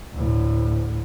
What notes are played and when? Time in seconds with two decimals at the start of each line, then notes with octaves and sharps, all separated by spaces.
0.14 D2 A2